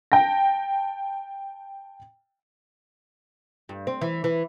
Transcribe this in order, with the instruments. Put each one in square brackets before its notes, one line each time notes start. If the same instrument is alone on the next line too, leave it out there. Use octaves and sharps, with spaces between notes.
[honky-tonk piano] G5 A5 A#6
[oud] G2
C4
E3
E3